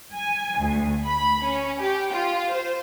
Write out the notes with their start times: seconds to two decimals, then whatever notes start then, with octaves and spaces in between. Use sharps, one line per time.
0.14 G#5
0.59 D2
1.05 B5
1.42 C#4
1.79 G4
2.12 F4
2.51 C5